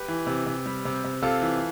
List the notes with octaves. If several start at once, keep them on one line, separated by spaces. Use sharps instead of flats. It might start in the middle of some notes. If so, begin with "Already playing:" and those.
Already playing: G4 B4
E3
C3
C3
G3
C3
C3
C3 F4 A4
E3